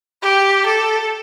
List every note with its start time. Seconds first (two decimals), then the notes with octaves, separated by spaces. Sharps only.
0.22 G4
0.66 A4